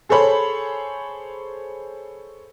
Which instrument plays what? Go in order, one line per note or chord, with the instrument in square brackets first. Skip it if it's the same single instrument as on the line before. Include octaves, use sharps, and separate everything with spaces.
[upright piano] G#4 A4 C5 C#5 B5